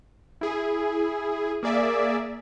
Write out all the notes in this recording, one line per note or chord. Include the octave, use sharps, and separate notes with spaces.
E4 G#4
A#3 G#4 D5 E5